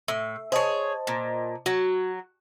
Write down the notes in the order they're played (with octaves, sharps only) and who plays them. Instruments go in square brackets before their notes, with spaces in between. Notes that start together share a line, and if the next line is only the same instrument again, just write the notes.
[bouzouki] A2 [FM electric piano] E5
[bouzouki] G#4 C#5 [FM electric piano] C5 D#5 A5
[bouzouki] A#2
[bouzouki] F#3 [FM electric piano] F#4